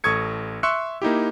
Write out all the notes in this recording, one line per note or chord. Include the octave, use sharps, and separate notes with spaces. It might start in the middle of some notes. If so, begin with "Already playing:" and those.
A1 A4 C#6 D#6 G#6 C#7
E5 C6 C#6 E6 F#6 C#7
A#3 D#4 E4 G4